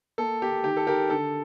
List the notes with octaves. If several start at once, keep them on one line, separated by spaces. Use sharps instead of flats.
A#3 A4
A#3 G4
D#3 G4
A4
D#3 G4 A#4
D3 A4